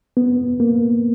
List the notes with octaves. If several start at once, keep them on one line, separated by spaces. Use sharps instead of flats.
B3
A#3